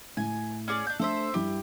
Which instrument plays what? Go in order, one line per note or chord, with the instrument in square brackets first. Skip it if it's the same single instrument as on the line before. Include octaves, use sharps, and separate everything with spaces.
[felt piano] A2 [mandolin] G#5
[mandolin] C#4 G#4 D5
D4 G6
[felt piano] A3 D4 [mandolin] A4 C5 E5
[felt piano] G2 E4 [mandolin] G4